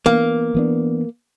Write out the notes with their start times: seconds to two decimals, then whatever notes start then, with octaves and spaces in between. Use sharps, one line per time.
0.06 E3 A#3 B3 D4
0.55 E3 B3 D4